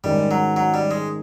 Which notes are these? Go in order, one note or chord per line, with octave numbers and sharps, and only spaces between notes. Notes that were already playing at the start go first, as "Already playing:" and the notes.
G#2 D#3 G3 G#3 C#4
F#3
F#3
G3
G#3